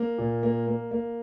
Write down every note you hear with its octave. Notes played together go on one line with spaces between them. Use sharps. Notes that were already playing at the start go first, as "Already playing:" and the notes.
Already playing: A#3
A#2
A#3
A#3
A#3